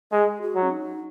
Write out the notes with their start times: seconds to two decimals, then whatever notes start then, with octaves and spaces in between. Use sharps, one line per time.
0.12 G#3 G#4
0.42 F#4
0.55 F#3
0.63 C#4
0.70 D#4